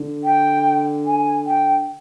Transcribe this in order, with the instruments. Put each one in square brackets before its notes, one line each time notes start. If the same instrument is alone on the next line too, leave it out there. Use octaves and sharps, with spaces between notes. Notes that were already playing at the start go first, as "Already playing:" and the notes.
Already playing: [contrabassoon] D3
[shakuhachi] G5
G#5
G5